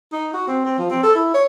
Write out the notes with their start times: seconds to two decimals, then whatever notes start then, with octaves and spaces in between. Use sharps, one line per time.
0.12 D#4
0.34 F#4
0.47 C4
0.65 C4
0.78 F3
0.90 C4
1.03 A4
1.15 E4
1.34 C#5